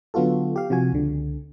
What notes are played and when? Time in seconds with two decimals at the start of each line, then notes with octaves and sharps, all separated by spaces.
0.14 D3 F#3 B3 F4 F#4 A4
0.56 G4 F5
0.70 C3 F3 F#4 G#5
0.92 C#2 D3